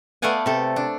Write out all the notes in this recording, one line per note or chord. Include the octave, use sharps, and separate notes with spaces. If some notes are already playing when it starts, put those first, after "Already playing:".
A3 B3 D5 F5 F#5 G#5
C3 A4
D4